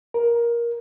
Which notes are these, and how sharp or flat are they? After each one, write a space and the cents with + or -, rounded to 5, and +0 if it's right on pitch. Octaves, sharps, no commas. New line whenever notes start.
A#4 +15